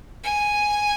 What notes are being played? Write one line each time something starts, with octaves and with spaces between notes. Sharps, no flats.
G#5